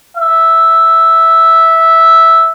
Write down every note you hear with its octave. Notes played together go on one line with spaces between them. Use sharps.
E5